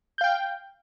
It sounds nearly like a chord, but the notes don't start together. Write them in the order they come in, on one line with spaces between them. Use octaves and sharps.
G6 F5 G5